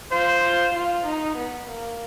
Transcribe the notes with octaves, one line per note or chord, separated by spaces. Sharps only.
F4 C5
F4
F4
D#4
B3
A#3